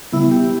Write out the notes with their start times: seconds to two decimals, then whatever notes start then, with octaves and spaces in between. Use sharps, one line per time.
0.13 C#3 G3 B3 E4
0.31 G4